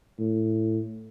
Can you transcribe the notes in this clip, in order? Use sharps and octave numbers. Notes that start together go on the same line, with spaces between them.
A2